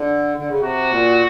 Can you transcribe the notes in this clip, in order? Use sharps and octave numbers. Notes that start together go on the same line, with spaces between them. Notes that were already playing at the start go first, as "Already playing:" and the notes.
Already playing: D3
D3
C#3
C3 F#4
A#2